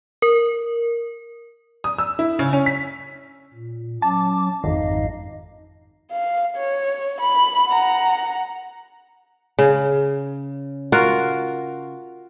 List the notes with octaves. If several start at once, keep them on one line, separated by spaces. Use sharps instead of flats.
A#4
D#6
E6
E4
C#3
C#4
B6
A#2
F#3 C#4 A5 D6
G#1 F2 D#4 D#5 F5
F5
C#5
B5
F#5 A#5
C#3
F4 F#4 A#4